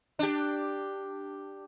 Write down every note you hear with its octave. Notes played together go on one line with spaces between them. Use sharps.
D4 G4